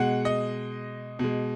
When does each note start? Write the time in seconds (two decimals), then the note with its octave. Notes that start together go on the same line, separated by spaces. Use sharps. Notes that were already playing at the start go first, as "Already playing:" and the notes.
Already playing: B2 G#3 F#5
0.25 D#5
1.19 B2 G#3